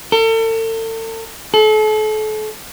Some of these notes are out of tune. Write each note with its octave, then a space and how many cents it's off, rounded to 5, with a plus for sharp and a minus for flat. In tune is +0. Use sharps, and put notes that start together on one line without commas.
A4 +40
A4 -35